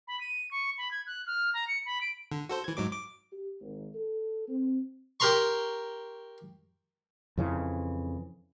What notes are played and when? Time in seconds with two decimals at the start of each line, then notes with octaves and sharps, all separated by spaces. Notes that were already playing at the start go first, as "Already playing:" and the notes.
0.08 B5
0.21 D#7
0.51 C#6
0.78 B5
0.91 G#6
1.07 F#6
1.27 F6
1.54 A#5
1.68 C#7
1.86 B5
2.01 D7
2.32 D3
2.49 F#4 A4 C5
2.64 E3 G#6
2.77 G#2 F#3 D6
2.92 D6
3.32 G4
3.61 G#1
3.95 A4
4.48 C4
5.20 G4 A#4 A#5 C6 C#6
7.37 F2 C#3 E3